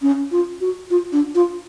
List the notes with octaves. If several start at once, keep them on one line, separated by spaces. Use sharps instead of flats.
C#4
F4
F#4
F4
D4
F4